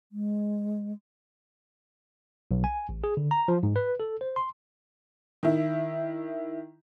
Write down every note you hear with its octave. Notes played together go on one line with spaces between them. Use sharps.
G#3
B1
G#5
A1
G#4
D3
A#5
F3
G#2
B4
A4
C5
C6
D#3 E4